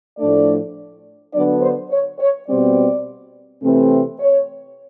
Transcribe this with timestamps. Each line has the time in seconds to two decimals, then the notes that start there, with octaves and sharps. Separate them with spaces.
0.18 A2 F3 A3 D4 D5
1.33 D3 F#3 B3 D4 D5
1.62 C5
1.91 C#5
2.19 C#5
2.48 B2 G3 C4 D5
3.62 C3 E3 A3 C4
4.20 C#5